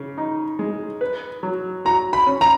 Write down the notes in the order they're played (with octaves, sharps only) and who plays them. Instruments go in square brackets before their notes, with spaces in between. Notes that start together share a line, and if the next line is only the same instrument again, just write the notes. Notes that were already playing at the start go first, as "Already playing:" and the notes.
Already playing: [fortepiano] C#3
D#4
G#3
B4
F#3
[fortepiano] F#4 [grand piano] A#5
[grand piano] B5
[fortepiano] C#4
[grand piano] A#5